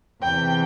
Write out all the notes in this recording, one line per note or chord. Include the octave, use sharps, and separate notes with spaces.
E2 C3 E3 G5